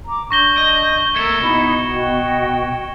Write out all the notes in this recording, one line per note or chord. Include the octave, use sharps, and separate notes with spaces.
A#5 D6
D4 C#6 G6 A#6 G7
D#5
A3 A#3 E6 G#6 C#7 E7
B2 D#4 E4 B5
F#4 D#5 G5